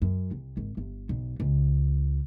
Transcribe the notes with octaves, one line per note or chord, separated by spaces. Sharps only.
F#2
C2
G#1
G1
B1
C#2